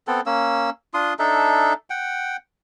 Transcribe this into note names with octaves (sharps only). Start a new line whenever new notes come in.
B3 C4 A4
A#3 C#4 E6
D4 F4 C6 D#6
D4 D#4 A4 E5
F#5 G5